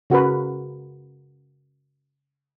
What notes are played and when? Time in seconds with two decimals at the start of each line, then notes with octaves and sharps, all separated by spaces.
0.10 C#3 F#4 A#4 B4